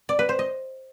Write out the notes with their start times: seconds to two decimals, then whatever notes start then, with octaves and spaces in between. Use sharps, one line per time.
0.09 D5
0.19 B4
0.29 C5
0.39 D#5